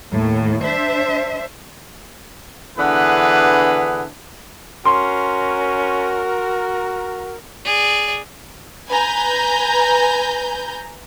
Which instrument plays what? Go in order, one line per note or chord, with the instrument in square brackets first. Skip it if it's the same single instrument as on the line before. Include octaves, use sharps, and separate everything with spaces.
[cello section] D#2 A2
D4 C5 E5
[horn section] D3 E3 B3 D4 G#4 B4
[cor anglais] C#4 [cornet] F#4 [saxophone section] A#4 [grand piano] C6
[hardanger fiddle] G#4 D5
[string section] B4 G#5 A#5 G6